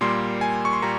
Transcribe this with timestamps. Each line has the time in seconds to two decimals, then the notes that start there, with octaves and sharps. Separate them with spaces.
0.01 A#2 G3 A#3 C6
0.41 G#5
0.65 C#6
0.73 C6
0.82 A#2 G3 A#5